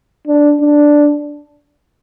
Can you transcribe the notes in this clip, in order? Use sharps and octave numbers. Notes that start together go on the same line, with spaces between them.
D4
D4